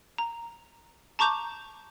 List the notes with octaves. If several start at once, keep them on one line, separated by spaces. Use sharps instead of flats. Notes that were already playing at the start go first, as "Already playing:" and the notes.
A#5
A5 A#5 C#6 D6 G6 F7